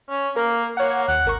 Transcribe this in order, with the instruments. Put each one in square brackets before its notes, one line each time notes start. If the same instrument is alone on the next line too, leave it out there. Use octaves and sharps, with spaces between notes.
[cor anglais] C#4
[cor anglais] A#3 [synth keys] A#4
[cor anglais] A#3 [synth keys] C#5 F#5
[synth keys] D#2 [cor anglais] F#5
[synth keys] G#1 A#4 C#6